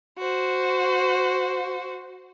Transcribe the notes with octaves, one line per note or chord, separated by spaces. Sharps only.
F#4 C5